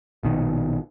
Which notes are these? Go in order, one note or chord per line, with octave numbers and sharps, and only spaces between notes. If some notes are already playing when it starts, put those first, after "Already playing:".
A#1 B2 D#3